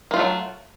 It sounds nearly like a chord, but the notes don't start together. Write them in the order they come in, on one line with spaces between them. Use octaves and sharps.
A#3 F4 A3 F#3